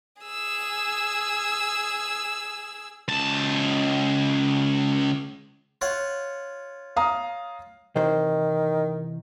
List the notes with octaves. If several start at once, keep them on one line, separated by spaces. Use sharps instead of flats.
G#4 E6
C#2 A5
F4 C#5 F#5
F5 A#5 D#6
C3 D#3 E3 C5